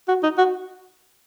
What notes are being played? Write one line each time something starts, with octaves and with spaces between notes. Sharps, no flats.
F#4
D#4
F#4